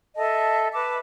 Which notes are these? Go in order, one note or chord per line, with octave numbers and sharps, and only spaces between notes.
A4 D#5 E5 A5
B4 A5 D6